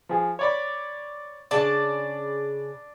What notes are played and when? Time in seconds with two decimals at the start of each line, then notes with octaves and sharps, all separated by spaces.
0.09 F3 G#4
0.39 C#5 D5 B5
1.51 C#3 D4 D5 A5